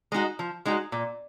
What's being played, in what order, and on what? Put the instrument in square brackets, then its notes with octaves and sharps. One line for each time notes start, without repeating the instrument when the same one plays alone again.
[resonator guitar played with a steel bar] G#3 D#4 F#4
F3
G#3 D#4 F#4
A#2